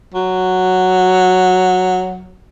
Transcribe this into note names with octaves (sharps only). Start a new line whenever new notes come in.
F#3